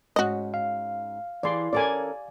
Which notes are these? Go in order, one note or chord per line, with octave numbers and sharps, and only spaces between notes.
G#2 C#4 F#4 D#5
F5
E3 G#4 D5 C6
C#4 A4 A#4 D5 G#5